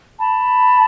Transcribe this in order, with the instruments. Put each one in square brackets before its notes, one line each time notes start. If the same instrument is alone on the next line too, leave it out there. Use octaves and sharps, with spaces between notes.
[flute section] A5 B5